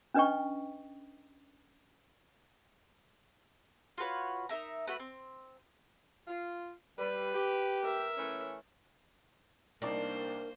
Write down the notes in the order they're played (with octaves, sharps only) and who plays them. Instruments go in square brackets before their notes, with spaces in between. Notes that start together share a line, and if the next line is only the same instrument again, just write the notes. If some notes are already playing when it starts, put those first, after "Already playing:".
[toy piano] C#4 D4 B4 D#5 G5 C#6
[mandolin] F4 F#4 B4 C#5
D#4 A#4 E5 A#5
A3 F#4 B4
C4
[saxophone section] F4
[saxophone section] G3 [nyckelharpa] B4
[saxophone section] G4
[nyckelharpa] A#4 E5
[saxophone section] E3 A3 C#4
[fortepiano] C2 D#4 D5 [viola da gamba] A#3 C5 [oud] D4 [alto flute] A#4